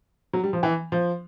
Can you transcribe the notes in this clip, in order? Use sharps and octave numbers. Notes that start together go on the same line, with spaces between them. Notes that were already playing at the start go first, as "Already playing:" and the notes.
F#3
G3
F3
E3
F3